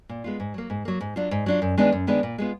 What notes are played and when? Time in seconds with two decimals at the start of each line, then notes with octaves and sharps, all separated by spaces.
0.09 A#2
0.24 G#3 B3 F4
0.40 G#2
0.54 F#3 A#3
0.70 G#2
0.85 F#3 A#3
1.01 G#2
1.16 F#3 D4 F4
1.31 G#2
1.46 F#3 D4 F4
1.62 F#2
1.78 D#3 G#3 B3 D4
1.92 F#2
2.07 D#3 G#3 B3 D4
2.23 A#2
2.38 G#3 B3 F4